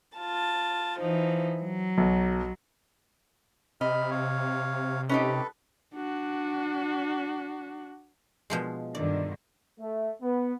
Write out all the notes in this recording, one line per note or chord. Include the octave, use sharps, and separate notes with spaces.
F4 A5
E3 F3 D#4
F#3
B1
C3 D#5 B5 F6
C#5 F5
C#4 D#4 G4 A4 B4
D4 F#4
B2 F3 G#3
G2 D3 D#3 D5
A3
B3